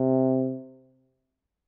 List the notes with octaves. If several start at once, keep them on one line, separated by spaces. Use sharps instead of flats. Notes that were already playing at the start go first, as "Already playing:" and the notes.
Already playing: C3